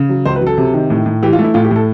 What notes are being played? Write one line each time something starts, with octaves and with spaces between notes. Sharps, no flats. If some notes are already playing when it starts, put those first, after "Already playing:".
Already playing: C#3
F#3
C#2 C5
B4
F#3
A4
C3
D#3
A2
A2
E3 G4
F4
A3
E4
A2 F4
G4
A2 A4